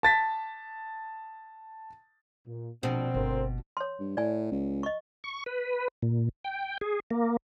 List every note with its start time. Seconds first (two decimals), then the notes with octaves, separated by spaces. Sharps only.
0.03 A5 A6 B6
2.47 A#2
2.83 A#1 B2 C4 D4
3.14 G1 D2 D3 A#4 C5
3.77 C#5 C6
3.99 G2
4.17 A2 D5 G#5
4.51 C#2
4.83 D#5 C#6
5.24 C#6
5.46 B4
6.02 A#2
6.44 G5
6.81 G#4
7.11 A#3